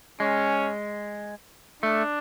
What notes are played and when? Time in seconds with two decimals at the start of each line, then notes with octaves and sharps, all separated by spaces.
0.20 G#3 C#4
1.83 A3 D4